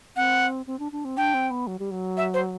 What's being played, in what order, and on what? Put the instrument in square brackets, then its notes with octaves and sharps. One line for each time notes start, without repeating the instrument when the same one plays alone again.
[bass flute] C4 [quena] F#5
[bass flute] C4
D4
D4
C4
[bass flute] D4 [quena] G5
[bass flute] C4
B3
F#3
G3
F#3
[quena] E5
C5